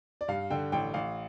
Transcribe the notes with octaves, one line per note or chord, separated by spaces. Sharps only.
D5
G2 F5
D3 G5
A1 G5
A1 F5